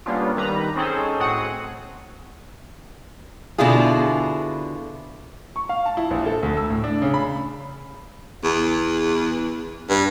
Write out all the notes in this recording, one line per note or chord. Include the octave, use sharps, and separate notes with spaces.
G3 A#3 B3 C#4 D4 F4
D#3 G3 B4 A#5
C4 C#4 D#4 G#4 A4 C5
A2 C4 F#4 G#4 F#5 D#6
B2 D3 E4 F4 G#4
C#6
F5
A5
E4
A#1
A4
D2
E6
A2
D4
C#3
B5
E2
G2